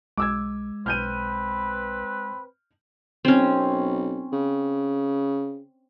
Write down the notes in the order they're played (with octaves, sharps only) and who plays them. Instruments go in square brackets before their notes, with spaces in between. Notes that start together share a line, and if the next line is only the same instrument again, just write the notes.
[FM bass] B1 [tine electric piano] G#3 [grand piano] D6 E6 G#6
[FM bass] B1 [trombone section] C4 B4 [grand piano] F6 G6 D#7
[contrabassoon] B1 [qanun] C4 C#4
[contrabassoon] C#3